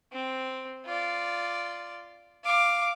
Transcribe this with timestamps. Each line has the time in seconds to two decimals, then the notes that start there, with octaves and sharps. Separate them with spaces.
0.12 C4
0.86 F4 D5
2.44 F5 D6